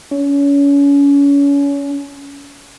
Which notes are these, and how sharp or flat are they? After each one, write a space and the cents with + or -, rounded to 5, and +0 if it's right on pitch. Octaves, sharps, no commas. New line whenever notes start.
C#4 +30